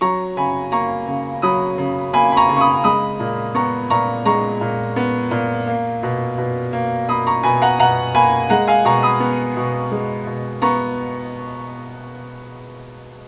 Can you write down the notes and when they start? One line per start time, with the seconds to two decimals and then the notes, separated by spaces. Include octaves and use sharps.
0.01 F#3 A#5 C#6
0.37 C#3 G#5 B5
0.72 A#3 A#5 C#6
1.07 C#3
1.42 F#3 B5 D#6
1.78 C#3
2.13 A#3 G#5 B5
2.32 B5
2.37 A#5 C#6
2.49 C#3
2.56 C#6
2.61 B5 D#6
2.84 G#3 B5 D#6
3.20 A#2
3.54 B3 A#5 C#6
3.90 A#2 A#5 C#6
4.25 G#3 A#5 C#6
4.61 A#2
4.96 B3
5.31 A#2
5.67 A#3
6.03 B2
6.38 B2
6.73 A#3
7.09 A#3 B5 D#6
7.27 A#5 C#6
7.43 B2 G#5 B5
7.62 F#5 A#5
7.79 B2 F#5 A#5
8.14 A#3 G#5 B5
8.50 G#3 F#5 A#5
8.67 F5 G#5
8.85 B2 A#5 C#6
9.02 B5 D#6
9.20 B3
9.57 B2
9.92 G#3
10.27 B2
10.62 B3 A#5 C#6